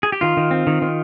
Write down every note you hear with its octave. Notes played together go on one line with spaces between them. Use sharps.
G#4
G4
D#3 F4
D#3
C4
D#3
D#3